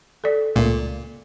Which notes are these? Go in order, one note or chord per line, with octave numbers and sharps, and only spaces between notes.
A4 D5
C#2 A#2 A3 A#3